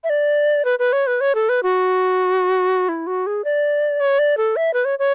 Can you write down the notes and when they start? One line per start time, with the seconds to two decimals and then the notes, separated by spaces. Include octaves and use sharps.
0.04 E5
0.10 D5
0.65 B4
0.79 B4
0.92 C#5
1.07 B4
1.21 C#5
1.35 A4
1.49 B4
1.63 F#4
2.89 E4
3.07 F#4
3.26 G#4
3.44 D5
4.00 C#5
4.19 D5
4.37 A4
4.56 E5
4.74 B4
4.85 C#5
4.99 C#5